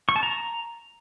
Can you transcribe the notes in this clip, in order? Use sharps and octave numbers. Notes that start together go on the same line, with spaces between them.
C#6
A5
A#5